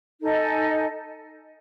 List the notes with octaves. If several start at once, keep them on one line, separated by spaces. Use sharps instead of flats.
D#4 A4 D#5 G#5